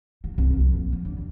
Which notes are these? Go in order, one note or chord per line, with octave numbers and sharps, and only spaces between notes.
D#3
C2
F2
A#1
F2
D3
D#2